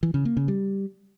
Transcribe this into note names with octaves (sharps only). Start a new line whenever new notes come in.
E3
C#3
A#3
C#3
G3